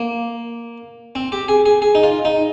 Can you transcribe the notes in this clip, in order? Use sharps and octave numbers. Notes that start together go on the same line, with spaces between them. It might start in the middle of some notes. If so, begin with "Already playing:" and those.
Already playing: A#3
C4
G4
G#4
G#4
G#4
D#4
F4
D#4